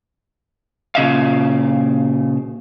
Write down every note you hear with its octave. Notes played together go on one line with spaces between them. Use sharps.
A#2 C#3 E5 F5